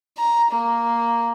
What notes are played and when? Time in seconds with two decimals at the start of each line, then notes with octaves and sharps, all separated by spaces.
0.17 A#5
0.51 A#3